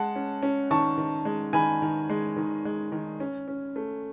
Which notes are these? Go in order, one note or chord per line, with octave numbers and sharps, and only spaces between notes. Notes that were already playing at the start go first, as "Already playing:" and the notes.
Already playing: G#3 F#5 A5
C#4
C#4
D#3 A5 C#6
D#3
G#3
D#3 G#5 B5
D#3
G#3
D#3
G#3
D#3
C#4
C#4
A3